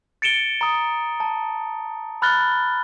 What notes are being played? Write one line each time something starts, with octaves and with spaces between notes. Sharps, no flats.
A6 C#7 D7 E7 G7
A#5 D#6
A5
B5 F6 F#6 A6 G7